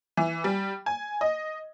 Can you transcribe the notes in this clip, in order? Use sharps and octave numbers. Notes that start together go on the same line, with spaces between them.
E3
G3
G#5
D#5